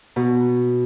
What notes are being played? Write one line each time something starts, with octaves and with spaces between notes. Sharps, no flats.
B2